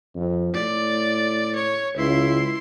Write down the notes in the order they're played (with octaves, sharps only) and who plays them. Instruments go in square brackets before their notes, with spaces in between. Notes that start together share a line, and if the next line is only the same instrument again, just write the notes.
[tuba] F2
[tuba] A2 [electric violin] D5
[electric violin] C#5
[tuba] C#2 [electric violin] E4 C6